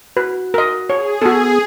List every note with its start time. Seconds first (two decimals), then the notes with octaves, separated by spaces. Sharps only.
0.17 F#4 B4
0.54 A#4 D#5
0.90 G#4 C#5
1.22 B3 F#4 A4